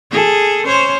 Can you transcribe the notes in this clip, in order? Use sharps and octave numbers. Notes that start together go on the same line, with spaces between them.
G#4 A4
C#4 C5 C#5